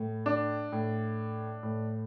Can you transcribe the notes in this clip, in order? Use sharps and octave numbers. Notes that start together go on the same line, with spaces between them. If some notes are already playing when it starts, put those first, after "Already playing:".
Already playing: A2
D4
A2
A2